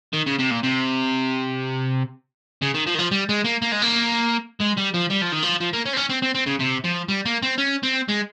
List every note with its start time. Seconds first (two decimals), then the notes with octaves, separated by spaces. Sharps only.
0.13 D#3
0.27 C#3
0.39 C3
0.51 A#2
0.64 C3
2.62 C#3
2.75 D#3
2.87 F3
2.95 D#3
2.99 F3
3.11 G3
3.29 G#3
3.45 A#3
3.62 A#3
3.72 G#3
3.82 A#3
4.61 G#3
4.78 G3
4.94 F3
5.10 G3
5.21 F3
5.32 D#3
5.42 F3
5.60 F3
5.73 A#3
5.85 C#4
5.93 C4
5.97 C#4
6.09 C4
6.22 C4
6.35 C4
6.47 C#3
6.60 C3
6.84 F3
7.08 G3
7.25 A#3
7.43 C4
7.58 C#4
7.83 C4
8.09 G#3